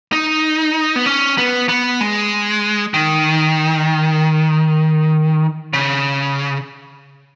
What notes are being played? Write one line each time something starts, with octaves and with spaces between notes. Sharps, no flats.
D#4
B3
C#4
B3
B3
G#3
D#3
C#3